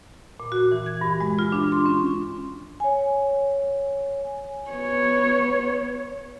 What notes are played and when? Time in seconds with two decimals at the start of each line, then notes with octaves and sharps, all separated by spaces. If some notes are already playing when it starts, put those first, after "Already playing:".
0.40 A#2
0.52 F#4
0.72 E3
0.86 G#6
1.01 G2
1.20 G#3
1.39 F4
1.52 D4
1.72 C6
1.86 C#4
2.80 C#5 G#5
4.71 B3 C#5